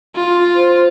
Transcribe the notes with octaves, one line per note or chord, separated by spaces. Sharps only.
F4
C5